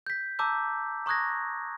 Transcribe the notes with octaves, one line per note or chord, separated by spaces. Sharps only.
G6 B6
A5 A#5 D6 E6 G6
A#5 C#6 D#6 F#6 G#6 A#6